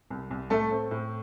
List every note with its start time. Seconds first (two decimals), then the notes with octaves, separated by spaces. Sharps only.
0.10 C2
0.31 C2
0.50 A2 A3 A4
0.71 C4
0.91 A2